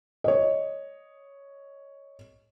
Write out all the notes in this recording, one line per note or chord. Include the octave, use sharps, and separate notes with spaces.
C#5 D#5